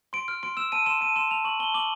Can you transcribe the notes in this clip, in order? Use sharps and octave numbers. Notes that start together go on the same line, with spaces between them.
C6 D7
F6 D7
C6 D7
E6 E7
A5 D#7
C6 E7
A5 D#7
C6 E7
A5 F7
C#6 F#7
A5 G7
D6 F#7